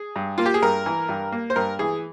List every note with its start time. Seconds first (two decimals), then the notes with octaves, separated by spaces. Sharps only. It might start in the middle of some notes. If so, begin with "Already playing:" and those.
Already playing: G#4
0.16 G2
0.38 A#3 F4
0.46 G4
0.54 G#4
0.62 G2 A#4
0.86 E3
1.09 G2
1.32 A#3
1.50 C5
1.56 G2 A#4
1.79 E3 G#4